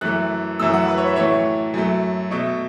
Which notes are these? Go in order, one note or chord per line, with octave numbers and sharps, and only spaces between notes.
F#2 E3 A3 F#6
F#2 E3 A3 E6
F#5
B4
C#5
E5
A2 E3 A3 C#5
F#2 F#3 A3
B2 A3